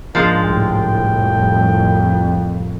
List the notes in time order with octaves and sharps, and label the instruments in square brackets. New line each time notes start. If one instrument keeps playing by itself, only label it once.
[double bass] G#2 [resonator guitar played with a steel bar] F3 G#3 D4 [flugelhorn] A#3
[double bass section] C2 A2 [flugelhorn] G5
[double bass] F2